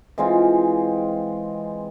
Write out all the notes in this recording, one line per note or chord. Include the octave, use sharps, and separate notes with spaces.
E3 G#3 C4 F4